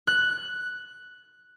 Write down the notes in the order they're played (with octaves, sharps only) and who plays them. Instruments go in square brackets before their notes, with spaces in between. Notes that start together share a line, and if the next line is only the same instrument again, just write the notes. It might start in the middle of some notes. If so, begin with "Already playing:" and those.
[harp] F#6